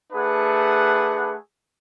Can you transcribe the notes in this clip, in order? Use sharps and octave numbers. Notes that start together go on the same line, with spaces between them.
A3 D4 G#4 B4 F#5